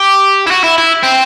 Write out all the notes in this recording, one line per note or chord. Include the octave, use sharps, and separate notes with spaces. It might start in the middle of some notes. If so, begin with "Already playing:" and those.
Already playing: G4
E4
F#4
E4
E4
C4